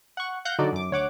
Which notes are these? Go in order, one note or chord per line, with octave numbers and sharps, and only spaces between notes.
F#5 C#6
F5 F#5 F#6 G6 A#6
D3 F#3 D#4 F#4 D5
F#2 D6
D2 C#5 F#5 D6